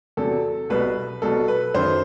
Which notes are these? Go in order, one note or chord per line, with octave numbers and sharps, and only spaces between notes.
E2 C3 F#3 A4
C2 B2 F#3 B4
C2 B2 F#3 A4
B4
F#2 D#3 A3 C5